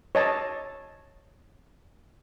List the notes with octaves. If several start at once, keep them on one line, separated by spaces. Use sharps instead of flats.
C#5 D#5 A5